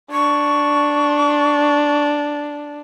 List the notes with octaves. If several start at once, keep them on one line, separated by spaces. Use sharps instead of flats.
D4 C#6